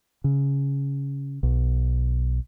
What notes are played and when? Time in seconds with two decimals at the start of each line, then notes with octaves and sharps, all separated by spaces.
0.24 C#3
1.43 B1